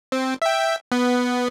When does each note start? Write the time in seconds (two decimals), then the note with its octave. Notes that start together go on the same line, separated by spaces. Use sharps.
0.12 C4
0.42 E5 G5
0.92 B3